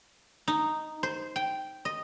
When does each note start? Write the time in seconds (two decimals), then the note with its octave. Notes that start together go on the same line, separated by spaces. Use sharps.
0.48 D#4
1.03 C5
1.36 G5
1.85 D#5